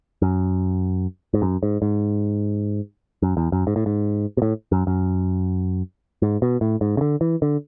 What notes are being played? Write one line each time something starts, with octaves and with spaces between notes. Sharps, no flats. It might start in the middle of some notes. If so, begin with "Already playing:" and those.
F#2
G#2
F#2
G#2
G#2
F#2
E2
F#2
G#2
A2
G#2
B2
A2
F#2
F#2
G#2
B2
A2
G#2
C#3
D3
E3
D3